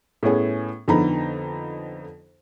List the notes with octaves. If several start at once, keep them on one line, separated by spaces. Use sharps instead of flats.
A2 A3 B3 C#4 G#4
F2 D3 B3 D#4 A#5 B5